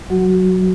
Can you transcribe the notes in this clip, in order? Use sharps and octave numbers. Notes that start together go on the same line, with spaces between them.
F#3 F#4